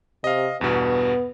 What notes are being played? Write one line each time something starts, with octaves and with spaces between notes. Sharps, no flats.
C3 D#5 F5
E2 G2 B2 B3